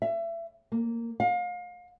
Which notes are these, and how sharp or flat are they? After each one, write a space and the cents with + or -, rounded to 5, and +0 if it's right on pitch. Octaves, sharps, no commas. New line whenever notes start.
E5 +30
A#3 -10
F5 +35